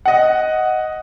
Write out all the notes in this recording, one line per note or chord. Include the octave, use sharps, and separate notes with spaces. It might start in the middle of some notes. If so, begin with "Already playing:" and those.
D#5 F#5